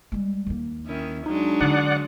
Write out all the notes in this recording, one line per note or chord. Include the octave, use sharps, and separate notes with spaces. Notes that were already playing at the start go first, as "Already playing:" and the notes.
G3 G#3
D#2 A#3
D#3 C#4 E4
F#3 G#3 D4 D#4
D3 E4 D5 F#5